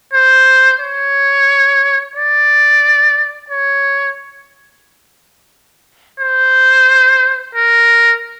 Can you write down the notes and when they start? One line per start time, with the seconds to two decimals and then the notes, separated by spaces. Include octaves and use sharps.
0.13 C5
0.80 C#5
2.16 D5
3.50 C#5
6.20 C5
7.55 A#4